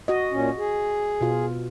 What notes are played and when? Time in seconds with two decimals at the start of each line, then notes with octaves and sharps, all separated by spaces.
0.08 F#4 D#5
0.31 A#2 C#4
0.58 G#4
1.21 B2 F4